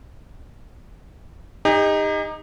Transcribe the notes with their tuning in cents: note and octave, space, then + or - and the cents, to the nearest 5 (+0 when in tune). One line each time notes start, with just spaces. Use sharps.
D#4 +0 G4 +45